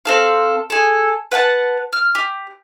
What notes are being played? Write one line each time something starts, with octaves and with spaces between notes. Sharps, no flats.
C4 A4 F5
G#4 A4
B4 F#5 G5 A5
F6
G4